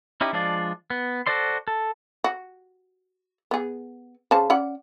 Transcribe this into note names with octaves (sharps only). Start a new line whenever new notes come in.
C#4 D#4 E4 G4
F3 G#3 D4 F4 D5
B3
F#4 A4 C5 D5 C6
A4
F#4
B3 G#4
C#3 C5 A5
C#4 D5 F#5